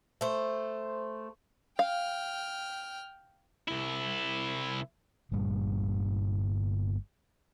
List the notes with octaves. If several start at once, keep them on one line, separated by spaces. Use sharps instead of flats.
A3 C5
F5 G5 F6
C2 E4
G1 G2 A#2 G3